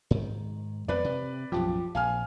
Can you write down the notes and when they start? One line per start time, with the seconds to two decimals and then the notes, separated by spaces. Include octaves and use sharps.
0.11 G#2 D#3
0.88 F2 B3 B4 D5
1.04 C3
1.52 B1 F#2 A2 F3 G4
1.95 A#1 F5 G#5 F6